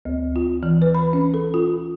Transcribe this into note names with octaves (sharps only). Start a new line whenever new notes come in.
D2
F4
E3
B4
B5
C#4
A4
F4